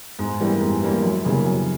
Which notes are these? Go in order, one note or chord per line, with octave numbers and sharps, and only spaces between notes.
G#2
E3 G3 A#3
G#2
E3 G3 A#3
F#2
C#3 E3 G3 A#3
F#2